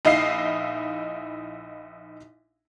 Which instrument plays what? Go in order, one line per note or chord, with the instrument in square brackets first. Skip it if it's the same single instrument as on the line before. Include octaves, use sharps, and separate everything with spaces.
[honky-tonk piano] A#1 D#4 E4 D#5 F5 C7